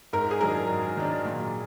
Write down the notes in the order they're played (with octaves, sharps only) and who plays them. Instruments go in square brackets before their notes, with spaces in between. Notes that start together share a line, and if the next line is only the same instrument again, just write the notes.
[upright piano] G#2 [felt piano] A#4
[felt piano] G#4
[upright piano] D#3 F#3 D4 [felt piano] A#4
[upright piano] G#2
D#3 F#3 D4
A#2